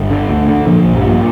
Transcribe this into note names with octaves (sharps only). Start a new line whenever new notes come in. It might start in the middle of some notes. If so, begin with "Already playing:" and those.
Already playing: G1
D3
D2
D3
A#2 F3
A#1
G2 G3
A#2